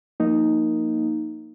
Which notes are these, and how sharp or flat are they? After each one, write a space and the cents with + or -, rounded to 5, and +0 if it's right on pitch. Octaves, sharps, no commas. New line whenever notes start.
F3 +25 A#3 +0 D#4 +0